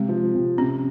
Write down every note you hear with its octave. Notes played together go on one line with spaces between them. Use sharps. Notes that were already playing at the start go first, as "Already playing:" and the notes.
Already playing: C3 G#3
F3
C3
C3 C#4